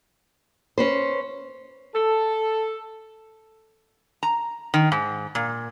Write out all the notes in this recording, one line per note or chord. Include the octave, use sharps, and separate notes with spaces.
C#4 B4 C5
A4
A#5
D#3
G#2
A#2